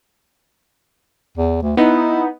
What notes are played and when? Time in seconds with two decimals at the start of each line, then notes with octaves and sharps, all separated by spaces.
1.38 E2
1.62 D2
1.77 B3 D#4 E4